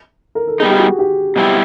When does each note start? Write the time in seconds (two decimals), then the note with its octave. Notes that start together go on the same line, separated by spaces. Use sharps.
0.35 A#4
0.47 A4
0.60 G3 B3 D#4 G#4
0.70 G4
0.79 F#4
0.99 G4
1.36 B2 G3 C4 E4